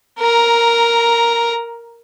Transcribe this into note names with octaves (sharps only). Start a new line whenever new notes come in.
A#4 A#5